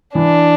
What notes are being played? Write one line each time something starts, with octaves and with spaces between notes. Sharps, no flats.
E3 D4